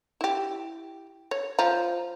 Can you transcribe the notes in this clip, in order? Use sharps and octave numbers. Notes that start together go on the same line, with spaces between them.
E4 G4
C#5
F3 A#5